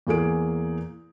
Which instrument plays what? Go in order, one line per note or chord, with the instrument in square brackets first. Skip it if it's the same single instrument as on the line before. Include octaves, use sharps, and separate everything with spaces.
[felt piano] E2 A#3 G#4 D7